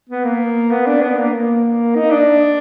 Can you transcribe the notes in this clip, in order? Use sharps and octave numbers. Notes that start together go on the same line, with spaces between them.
B3
A#3
B3
D4
B3
A#3
A#3
D#4
D4